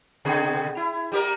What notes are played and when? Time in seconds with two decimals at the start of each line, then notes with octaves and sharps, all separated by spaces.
0.25 B2 D3 G#4
0.77 E4
1.12 G3 G4 A#4